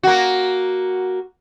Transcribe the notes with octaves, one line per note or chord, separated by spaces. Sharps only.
A#3 F#4